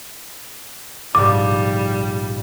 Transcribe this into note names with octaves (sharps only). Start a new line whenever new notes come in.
A#1 G#2 C3 G3 D6